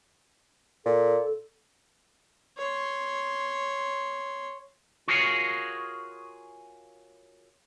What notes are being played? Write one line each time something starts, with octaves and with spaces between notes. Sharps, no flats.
A#2 A4
C#5 C6
F4 F#4 G#4 A#4 C#5 F5